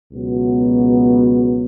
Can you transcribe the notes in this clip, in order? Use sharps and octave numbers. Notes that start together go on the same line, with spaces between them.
C#2 B2 F#3 B3 F#4